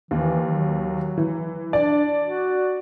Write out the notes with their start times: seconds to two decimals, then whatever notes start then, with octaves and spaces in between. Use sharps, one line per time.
0.11 D#2 E3
0.46 F#3
1.18 E3
1.73 D4 D5
2.23 F#4